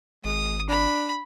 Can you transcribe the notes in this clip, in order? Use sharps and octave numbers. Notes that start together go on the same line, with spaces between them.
G#1 G#3 D#6
D4 B5